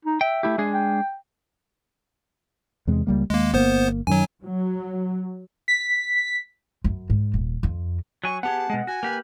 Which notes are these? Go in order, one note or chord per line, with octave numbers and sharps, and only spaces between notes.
D#4
E5 G5
A3 E4 G4
G#3 D4 G#4
G5
E2 C3 G#3
C#2 G3 A#3
D#2 G#3 A#3
G1 A#3 B3 C5
F#2 D#3 F#3 G#5
F#3
B6
F#2
G#2
D#1
F2
F#3 G#5 C#6
B3 G4 G#4 F#5 A5
B2 G#3
F#4 G#5
A#3 G4 B4